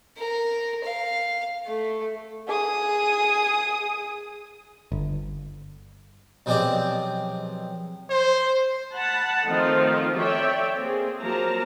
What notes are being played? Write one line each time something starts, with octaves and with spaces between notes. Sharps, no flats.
A#4
F5
A3
G#4 D#6
G1
B1 F3 G#3 C4 G4 D5
C5
F#5 A5 B5
D#3 F3 A3 C4 D#4 F4
A4 C#5 D5 E5 G5
A#3 C4 G#4
F3 F#3 A#3 A#4 A5 A#5